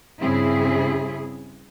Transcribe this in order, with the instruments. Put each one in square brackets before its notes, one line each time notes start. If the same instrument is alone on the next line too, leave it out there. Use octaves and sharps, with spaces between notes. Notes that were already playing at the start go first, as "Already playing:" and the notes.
[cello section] G2 C#3 C4 E4 G#4